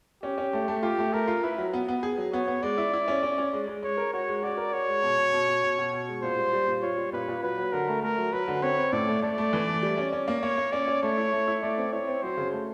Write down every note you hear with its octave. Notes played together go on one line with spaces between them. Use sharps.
C#4 G4
C#4
A3
A3
F4 G4
A3
A3 A#4
F4
E4 B4
F#3
B3
B3
G#4
F#3
B3 C#5
B3
G#3 D5
E4
E4
C#4
C#4
C#4
G#3
G#3
G#3 C#5
A#4
F#4 C#5
G#3
F#4 D5
A#4
F#4 C#5
G#3
B2
B2
B2
B2
B2
B2
B2
G#3
A#2 C5
G3
G3
A#2
F4 C#5
G3
A#2 B4
A#2
F#3 B4
F#3
D3 A#4
A3
A3 A#4
F#3
F#3 B4
D3
C4 C#5
C4
A2 D5
A3
A3 D5
A3
E3
A3
G3
C#4
C#4
A#3
A#3 C#5
A#3
C#4 D5
C#4
A3 C#5
E4
A3
E4
A3 D5
C4
E4 C#5
C4
F#3 C5
C#3
A3